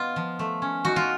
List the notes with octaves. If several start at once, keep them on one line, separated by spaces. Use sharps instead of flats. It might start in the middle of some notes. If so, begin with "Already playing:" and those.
Already playing: B3 D#4 F4
F3
A3
C#4
D#4 F#4
F4